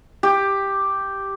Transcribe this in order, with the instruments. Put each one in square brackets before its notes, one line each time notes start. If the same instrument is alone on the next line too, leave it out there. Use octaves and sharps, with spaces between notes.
[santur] G4